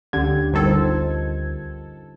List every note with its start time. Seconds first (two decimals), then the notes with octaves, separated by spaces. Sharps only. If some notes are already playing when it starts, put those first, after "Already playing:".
0.13 D2 D3 C#4 G4 G#6
0.53 G1 D3 D#3 G3 A4
0.66 D#4 F4 C5